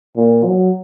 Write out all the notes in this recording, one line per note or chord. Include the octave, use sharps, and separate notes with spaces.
A#2
F#3